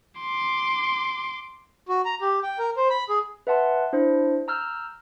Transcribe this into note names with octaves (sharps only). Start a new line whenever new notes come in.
C6 D6
F#4
A#5
G4
G5
A#4
C5
B5
G#4
B4 E5 F#5 A5 C6
D4 E4 C5
A#5 E6 F6 G6